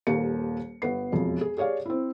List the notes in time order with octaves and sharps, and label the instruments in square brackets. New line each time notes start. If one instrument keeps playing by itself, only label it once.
[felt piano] D#1 D#2 A#4 C#7
G1 B3 C7
E1 F2
G#4
G4 G#4 C#5 D5 F5
C4 E4